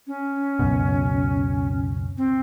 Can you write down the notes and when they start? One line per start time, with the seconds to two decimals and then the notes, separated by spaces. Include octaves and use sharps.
0.07 C#4
0.59 C#2 F#2 B2
2.17 C4